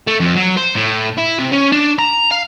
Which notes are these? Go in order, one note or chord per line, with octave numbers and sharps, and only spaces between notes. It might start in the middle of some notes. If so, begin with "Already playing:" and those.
A3
F2
F#3
C5
A2
E4
C3
C#4
D4
A#5
F5